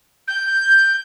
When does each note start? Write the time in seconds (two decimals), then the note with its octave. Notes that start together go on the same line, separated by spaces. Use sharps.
0.27 G6